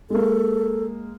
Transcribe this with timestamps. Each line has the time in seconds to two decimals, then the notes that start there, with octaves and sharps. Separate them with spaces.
0.10 G#3 A#3 A4